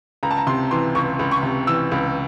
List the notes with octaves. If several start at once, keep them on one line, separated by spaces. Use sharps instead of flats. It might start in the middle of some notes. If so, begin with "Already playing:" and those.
C#2 A#5
A5
A#5
C3 C6
E3 C6
C#2 C#6
C#2
C#6
C3
E3 E6
C#2